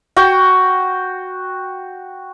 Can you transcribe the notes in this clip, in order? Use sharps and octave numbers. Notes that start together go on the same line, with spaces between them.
F#4 G5